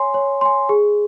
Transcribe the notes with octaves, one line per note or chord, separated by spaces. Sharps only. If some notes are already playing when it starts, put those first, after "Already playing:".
Already playing: C#5 G#5 C6
C#5
G#5 C6
G#4